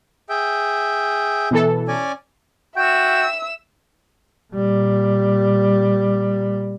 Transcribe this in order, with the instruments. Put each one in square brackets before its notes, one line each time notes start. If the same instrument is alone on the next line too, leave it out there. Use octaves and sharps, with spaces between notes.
[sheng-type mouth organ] G#4 E5 G5
[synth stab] B2 E3 A4
[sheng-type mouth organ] C#4 D5 G#5
[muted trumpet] F#4 [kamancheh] E5 E6 [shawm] G5
[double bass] A#2 G3